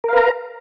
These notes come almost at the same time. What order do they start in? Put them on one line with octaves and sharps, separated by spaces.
A#4 F5 B4 A#5